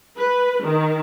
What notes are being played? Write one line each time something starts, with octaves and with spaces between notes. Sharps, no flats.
B4
D#3